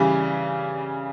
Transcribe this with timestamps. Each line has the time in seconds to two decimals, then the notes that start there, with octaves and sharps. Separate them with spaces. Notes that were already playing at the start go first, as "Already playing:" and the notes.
Already playing: C#3 E3 G3